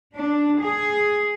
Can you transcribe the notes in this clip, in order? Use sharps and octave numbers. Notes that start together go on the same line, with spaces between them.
D4
G#4